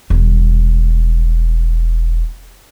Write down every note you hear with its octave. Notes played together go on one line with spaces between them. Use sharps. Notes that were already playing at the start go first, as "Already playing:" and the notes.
E1 G3